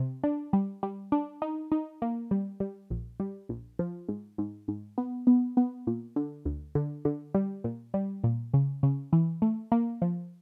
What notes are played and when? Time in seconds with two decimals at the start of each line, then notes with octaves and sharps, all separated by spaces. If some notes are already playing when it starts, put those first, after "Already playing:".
Already playing: C3
0.23 D4
0.53 G3
0.83 G3
1.12 D4
1.42 D#4
1.72 D#4
2.02 A#3
2.31 G3
2.60 G3
2.90 A#1
3.20 G3
3.49 A#1
3.79 F3
4.09 G#2
4.38 G#2
4.68 G#2
4.98 B3
5.27 B3
5.57 B3
5.87 A#2
6.16 D3
6.45 D2
6.75 D3
7.05 D3
7.35 G3
7.64 A#2
7.94 G3
8.24 A#2
8.54 C#3
8.83 C#3
9.13 E3
9.42 A3
9.72 A#3
10.02 F3